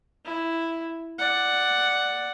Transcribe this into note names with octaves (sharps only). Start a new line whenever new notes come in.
E4
D5 F#5